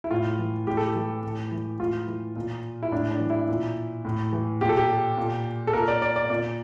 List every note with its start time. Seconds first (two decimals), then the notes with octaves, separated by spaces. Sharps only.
0.04 E4
0.11 A2 F4
0.39 E3
0.67 A2 G4
0.77 A4
0.87 G4
0.95 E3
1.23 A2
1.51 E3
1.79 A2 F4
2.07 E3
2.36 A#2
2.83 E4
2.92 A2 D4
3.11 D4
3.20 E3
3.30 E4
3.49 A#2
4.05 A2
4.33 E3
4.61 A#2 G4
4.69 A4
4.77 G4
5.17 A#2
5.67 A4
5.73 A#2 A#4
5.88 D5
6.02 D5
6.16 D5
6.30 A#2 D5